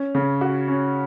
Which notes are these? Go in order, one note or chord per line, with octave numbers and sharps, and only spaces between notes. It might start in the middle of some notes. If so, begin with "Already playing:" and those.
Already playing: C#4
C#3
F#4
C#4